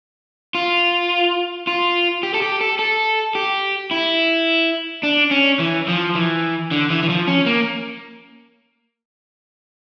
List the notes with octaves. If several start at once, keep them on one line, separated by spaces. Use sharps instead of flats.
F4
F4
G4
A4
G4
A4
A4
G4
E4
D4
C#4
E3
F3
E3
D3
E3
E3
F3
C#4
A#3